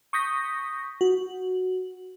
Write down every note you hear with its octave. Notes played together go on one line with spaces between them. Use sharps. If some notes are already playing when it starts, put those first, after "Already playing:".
C#6 D#6 G6 A#6 B6
F#4